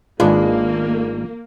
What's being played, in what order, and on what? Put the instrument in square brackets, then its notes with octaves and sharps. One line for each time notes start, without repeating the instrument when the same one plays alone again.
[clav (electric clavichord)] G#1 D4 B4 [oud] G#3 [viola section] A#3 [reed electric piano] F4